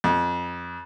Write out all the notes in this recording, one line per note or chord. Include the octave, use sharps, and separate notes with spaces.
F2